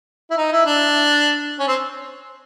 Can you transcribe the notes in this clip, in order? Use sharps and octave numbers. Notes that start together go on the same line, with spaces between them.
E4
D#4
E4
D4
C#4
C4